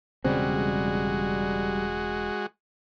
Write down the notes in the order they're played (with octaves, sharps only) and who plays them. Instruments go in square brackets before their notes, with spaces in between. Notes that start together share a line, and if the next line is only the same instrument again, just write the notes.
[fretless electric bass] E1 C#3 C4 [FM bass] G3 [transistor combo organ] G#3 F#4